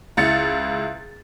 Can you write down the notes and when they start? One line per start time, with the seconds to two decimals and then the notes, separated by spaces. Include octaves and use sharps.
0.17 C#2 E4 A6 C#7